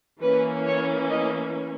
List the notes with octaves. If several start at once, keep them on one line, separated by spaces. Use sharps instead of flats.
E3 A#3 C#4 B4
C#5
D#5